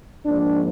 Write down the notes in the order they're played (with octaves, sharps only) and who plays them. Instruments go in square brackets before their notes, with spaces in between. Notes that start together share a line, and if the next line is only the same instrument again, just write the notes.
[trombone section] G#2 F3 A#3 D4